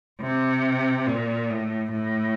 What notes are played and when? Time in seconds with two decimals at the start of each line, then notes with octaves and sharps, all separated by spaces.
0.21 C3
1.07 A#2
1.50 A2
1.92 A2